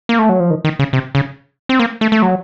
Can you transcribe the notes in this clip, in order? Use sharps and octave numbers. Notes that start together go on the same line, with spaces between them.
A#3
A3
F#3
F3
D#3
D#3
C#3
C3
C#3
C4
A#3
A3
A3
F#3